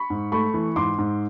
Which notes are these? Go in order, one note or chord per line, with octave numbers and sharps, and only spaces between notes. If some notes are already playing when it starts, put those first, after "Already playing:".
Already playing: B5 C#6
G#2
A3 B5 C#6
E3
G#2 C6 D6
G#2